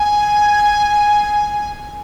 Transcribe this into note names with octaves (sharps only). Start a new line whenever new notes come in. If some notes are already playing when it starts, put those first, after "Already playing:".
Already playing: G#5